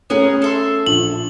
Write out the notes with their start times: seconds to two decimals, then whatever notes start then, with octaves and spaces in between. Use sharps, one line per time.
0.10 A3 B3 C#4 G#4 A#4 C#5
0.42 A4 E5 C6
0.86 A#1 F#7